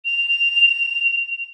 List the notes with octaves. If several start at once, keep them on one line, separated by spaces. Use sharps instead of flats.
F7